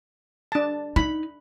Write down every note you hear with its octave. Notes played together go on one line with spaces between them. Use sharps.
D4 A5
D#4 B5